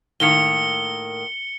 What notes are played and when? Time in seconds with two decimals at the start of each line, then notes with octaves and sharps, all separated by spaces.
0.20 A2 D#3 A#3 C#7 G7